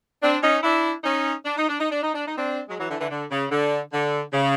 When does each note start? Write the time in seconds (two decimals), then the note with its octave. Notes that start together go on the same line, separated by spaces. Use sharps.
0.22 C4 D4
0.43 C#4 D#4
0.63 D4 E4
1.04 C#4 D#4
1.45 D4
1.57 D#4
1.69 D4
1.80 D#4
1.91 D4
2.02 D#4
2.14 D4
2.27 D#4
2.37 C4 D4
2.69 F#3 G#3
2.79 E3 F#3
2.89 D3 E3
2.99 D3 E3
3.10 D3
3.31 C#3
3.51 D3
3.93 D3
4.33 C#3